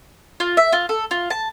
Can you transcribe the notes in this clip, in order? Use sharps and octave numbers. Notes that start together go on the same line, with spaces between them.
F4
E5
F4
A4
F4
A5